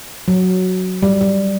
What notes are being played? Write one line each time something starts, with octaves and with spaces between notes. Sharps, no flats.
F#3
G3
G3